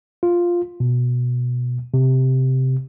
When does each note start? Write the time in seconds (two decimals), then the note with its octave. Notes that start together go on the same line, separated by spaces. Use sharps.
0.23 F4
0.80 B2
1.94 C3